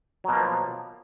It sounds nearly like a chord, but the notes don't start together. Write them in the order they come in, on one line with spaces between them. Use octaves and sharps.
F#3 B2 A#3 F3